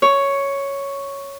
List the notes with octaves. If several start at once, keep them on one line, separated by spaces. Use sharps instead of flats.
C#5